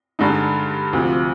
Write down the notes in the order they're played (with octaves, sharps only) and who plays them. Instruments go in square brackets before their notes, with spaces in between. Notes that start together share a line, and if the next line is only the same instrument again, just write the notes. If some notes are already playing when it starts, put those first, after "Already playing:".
[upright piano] G2 D3 G#3 D#4
D2 C3 F3